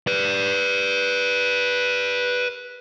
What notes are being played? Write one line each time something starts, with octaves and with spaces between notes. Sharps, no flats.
B4 D5